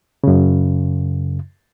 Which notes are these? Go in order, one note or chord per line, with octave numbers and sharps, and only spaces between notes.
F#2 C#3